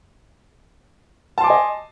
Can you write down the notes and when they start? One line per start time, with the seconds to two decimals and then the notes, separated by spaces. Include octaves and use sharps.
1.38 A5
1.41 C6
1.44 D6
1.47 G#5
1.50 D#5